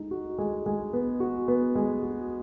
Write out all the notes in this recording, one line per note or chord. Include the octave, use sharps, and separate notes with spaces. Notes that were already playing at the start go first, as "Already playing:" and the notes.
Already playing: G#3 D#4
F#4
G#3
G#3
B3
F#4
B3
G#3
F#4